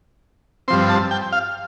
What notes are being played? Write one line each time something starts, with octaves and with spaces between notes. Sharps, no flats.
G2 F3 C4 C6
A5
G5
F5